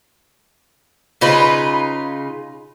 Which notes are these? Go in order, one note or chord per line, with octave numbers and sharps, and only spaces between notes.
C#3 D#4 F4 B4